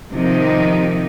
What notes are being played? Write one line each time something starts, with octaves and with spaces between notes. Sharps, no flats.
C3 D#3 F3 D#4